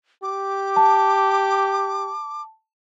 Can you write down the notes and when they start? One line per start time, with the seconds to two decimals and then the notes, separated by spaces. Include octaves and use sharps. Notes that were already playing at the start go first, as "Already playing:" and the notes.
0.23 G4 D6
0.76 A5